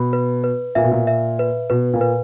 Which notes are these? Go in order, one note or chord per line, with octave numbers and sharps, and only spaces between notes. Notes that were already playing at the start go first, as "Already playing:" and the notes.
Already playing: B2 B5
B4
B4
A#2 E5
B2
A#2
E5
B4
B2 B4
A#2
B4